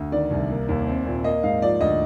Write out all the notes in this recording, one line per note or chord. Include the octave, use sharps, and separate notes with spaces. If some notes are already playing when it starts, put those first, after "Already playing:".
Already playing: D2
D#3 D5
C2
A#3
D#2
C4
A#2
A#3 D#5
G#2 F5
F3 D5
D2 D#5